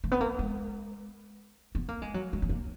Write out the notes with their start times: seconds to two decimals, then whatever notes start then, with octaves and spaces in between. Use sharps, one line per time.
0.04 A#3
0.11 B3
0.21 A#3
0.39 G#3
1.75 B3
1.88 A#3
2.02 G#3
2.14 F#3
2.33 G#3
2.42 B3
2.49 A#3